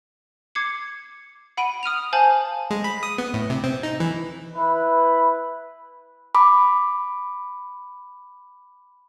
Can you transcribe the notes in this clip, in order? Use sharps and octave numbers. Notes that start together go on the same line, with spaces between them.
D6 G#6 C7 C#7
F#5 B5 D7 D#7
D#6 F6 D#7 F7
C5 F5 G#5 A5 G6 F#7
G#3
B5
D#6
B3
A2
C3
C4
D#4
E3
E4 B4
B5 D6